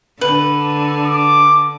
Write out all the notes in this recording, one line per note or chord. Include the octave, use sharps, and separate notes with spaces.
D3 B4
D6